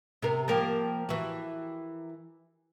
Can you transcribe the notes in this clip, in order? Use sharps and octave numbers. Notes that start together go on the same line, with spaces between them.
C3 B3 A#4
F3 A#3 G4 A#4 A5
E3 F#4